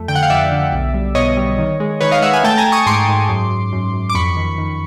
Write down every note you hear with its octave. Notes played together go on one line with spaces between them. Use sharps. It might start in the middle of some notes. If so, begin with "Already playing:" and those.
Already playing: F2 A3
D3 G5
F#5
F5
F2 D5 E5
D3
B1
G3
B2 C#5 D#5
G3
D#3
G#3
D#3 B4 C#5
D#5 F5
G#3 E5 F#5
F#5 G#5
A3 G5 A5
G#5 A#5
A3
C#6 D#6
G#2 C6 D6
G#2
F#2
F#2
F#2
F#2
D6
F2 B5 C#6
D#3
D#3